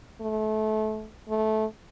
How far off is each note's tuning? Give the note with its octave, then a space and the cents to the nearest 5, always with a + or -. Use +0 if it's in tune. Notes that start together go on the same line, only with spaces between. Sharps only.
A3 -25
A3 -15